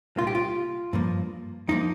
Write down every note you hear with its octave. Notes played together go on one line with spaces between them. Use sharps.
C2 A#2 A#3 F4
G4
F4
G2 F3 A#3
F2 F3 A#3 D#4